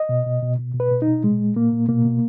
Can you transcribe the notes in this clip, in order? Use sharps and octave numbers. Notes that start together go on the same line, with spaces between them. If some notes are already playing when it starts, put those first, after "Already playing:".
Already playing: D#5
B2
B2
B2
B2
B2
B4
B2
D#4
B2
A#2 G#3
A#2
A#2 A#3
A#2
B2 A#3
B2